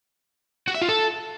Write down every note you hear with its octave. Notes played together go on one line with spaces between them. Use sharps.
F#4
E5
F4
A4